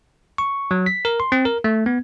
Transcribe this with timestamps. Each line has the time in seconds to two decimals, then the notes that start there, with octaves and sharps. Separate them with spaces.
0.38 C#6
0.71 F#3
0.86 B6
1.05 A#4
1.20 C6
1.32 C4
1.45 A#4
1.64 A3
1.86 B3